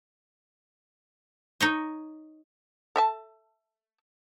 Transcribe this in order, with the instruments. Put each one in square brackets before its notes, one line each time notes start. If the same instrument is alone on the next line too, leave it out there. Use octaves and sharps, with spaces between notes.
[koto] D#4 C#5 D#5
[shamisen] A4 E5 A5